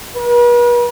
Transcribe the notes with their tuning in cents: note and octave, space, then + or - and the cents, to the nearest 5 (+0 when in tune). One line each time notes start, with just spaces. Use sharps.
B4 -45